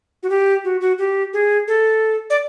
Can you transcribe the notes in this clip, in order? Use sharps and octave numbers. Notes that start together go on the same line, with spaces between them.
F#4
G4
F#4
F#4
G4
G#4
A4
D5